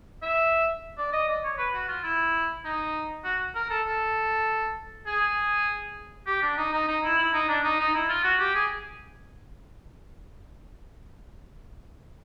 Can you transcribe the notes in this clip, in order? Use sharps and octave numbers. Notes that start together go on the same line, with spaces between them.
E5
D5
D#5
D5
C#5
B4
F#4
F4
E4
D#4
F#4
A#4
A4
A4
G#4
G4
D4
D#4
D#4
D#4
E4
E4
D#4
D4
D#4
D#4
E4
F4
F#4
G4
G#4